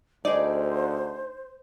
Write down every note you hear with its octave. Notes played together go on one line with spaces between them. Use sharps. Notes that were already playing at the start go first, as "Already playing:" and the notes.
D2 D#4 G#4 C5 D5